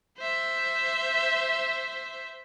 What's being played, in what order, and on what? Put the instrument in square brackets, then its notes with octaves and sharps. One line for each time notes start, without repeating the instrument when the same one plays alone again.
[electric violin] C5 E5